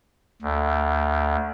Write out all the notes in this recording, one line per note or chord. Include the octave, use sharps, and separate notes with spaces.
D2